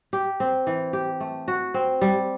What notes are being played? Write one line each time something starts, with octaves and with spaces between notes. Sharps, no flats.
G4
C4
E3
G4
A3
F#4
C4
G3